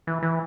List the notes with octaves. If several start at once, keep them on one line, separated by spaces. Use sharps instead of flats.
E3
E3